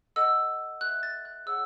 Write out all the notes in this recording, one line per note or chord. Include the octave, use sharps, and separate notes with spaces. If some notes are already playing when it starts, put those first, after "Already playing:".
A4 D#5 F#5 E6
A4 E5 F#6
A6
F#6
G#4 C#5 F#5 E6